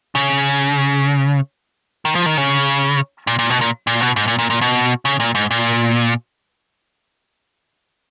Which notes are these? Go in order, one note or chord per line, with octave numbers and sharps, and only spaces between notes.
C#3
D#3
F3
D#3
C#3
A#2
A#2
B2
A#2
A#2
B2
G#2
A#2
A#2
A#2
B2
C#3
A#2
G#2
A#2